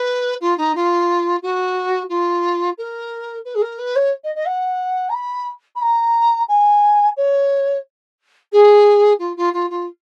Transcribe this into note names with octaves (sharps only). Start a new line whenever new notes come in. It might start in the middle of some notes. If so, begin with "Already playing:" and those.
Already playing: B4
F4
D#4
F4
F#4
F4
A#4
B4
G#4
A#4
B4
C#5
D#5
D#5
F#5
A#5
B5
B5
A#5
G#5
C#5
G#4
F4
F4
F4
F4